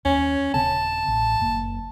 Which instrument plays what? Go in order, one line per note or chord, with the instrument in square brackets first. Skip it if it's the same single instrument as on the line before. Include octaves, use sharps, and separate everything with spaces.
[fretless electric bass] D#2 [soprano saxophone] C#4
[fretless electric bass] D#1 C#3 C4 [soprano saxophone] A5
[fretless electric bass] A1
F#1 A#3